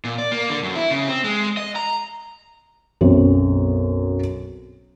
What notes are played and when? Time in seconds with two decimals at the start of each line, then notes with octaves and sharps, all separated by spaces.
0.05 A#2
0.18 D5
0.32 A#3
0.50 D3
0.63 F#2
0.75 E4
0.91 C#3
1.08 C4
1.24 G#3
1.57 D#5
1.76 A#5
3.01 B1 F#2 C4